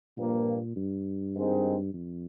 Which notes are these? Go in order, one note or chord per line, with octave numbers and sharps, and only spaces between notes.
G2 A#2 F3 A#3
G2
G#2 D#3 G#3 C4 D#4
F2